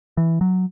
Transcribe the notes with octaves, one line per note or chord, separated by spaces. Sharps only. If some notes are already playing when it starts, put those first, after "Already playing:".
E3
F#3